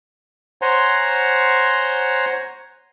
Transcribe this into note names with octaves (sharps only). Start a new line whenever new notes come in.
C5 C#5 F#5 G#5 A#5 C6